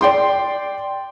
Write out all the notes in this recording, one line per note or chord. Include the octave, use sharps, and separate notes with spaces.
D5 G5 C6